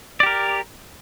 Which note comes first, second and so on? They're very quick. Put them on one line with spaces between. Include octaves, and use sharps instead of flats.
D5 G4 A#4